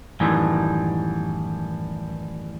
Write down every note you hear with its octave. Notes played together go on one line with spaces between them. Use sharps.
F#2 A2 D#3 E3 G3